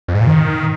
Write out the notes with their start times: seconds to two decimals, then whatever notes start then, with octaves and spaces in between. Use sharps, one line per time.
0.08 F2
0.15 G#2
0.21 A#2
0.27 D#3